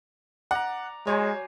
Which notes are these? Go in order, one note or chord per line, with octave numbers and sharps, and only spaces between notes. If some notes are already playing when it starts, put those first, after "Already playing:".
D5 F#5 A#5
F#3 G#3 C5 C#5 G#5